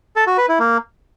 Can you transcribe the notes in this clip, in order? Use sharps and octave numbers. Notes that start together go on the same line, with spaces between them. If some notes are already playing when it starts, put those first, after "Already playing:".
A4
F#4
B4
E4
A#3